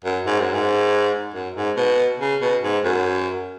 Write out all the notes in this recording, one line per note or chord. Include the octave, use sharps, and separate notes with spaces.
F#2
G#2
F#2
G#2
F#2
G#2
B2
C#3
B2
G#2
F#2